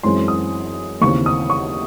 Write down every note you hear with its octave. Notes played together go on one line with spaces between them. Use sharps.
F#2 E3 G#3 C4 C6
D#6
D#2 C#3 E3 C4 C#6
D#6
C#6